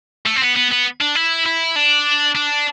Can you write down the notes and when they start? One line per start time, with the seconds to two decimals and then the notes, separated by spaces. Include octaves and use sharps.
0.26 A3
0.36 C4
0.41 B3
0.56 B3
0.71 B3
1.01 D4
1.15 E4
1.46 E4
1.76 D4
2.35 D4